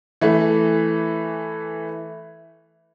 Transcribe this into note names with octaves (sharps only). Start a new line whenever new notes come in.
E3 A3